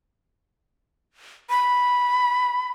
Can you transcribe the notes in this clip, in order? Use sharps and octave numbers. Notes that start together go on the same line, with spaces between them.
B5